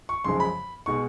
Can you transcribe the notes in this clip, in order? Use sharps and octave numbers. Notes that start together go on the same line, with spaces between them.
C#6
F#2 C#3 F3 G#3 C6
B5
B2 G#3 C#6